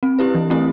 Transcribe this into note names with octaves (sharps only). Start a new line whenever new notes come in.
C4
E4 G4 B4
E3
A3 C4 E4 G4